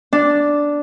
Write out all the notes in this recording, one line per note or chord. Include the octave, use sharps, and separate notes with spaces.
D4